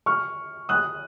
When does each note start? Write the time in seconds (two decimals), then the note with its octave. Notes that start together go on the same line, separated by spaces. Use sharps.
0.06 C#6 F6
0.69 D#6 F#6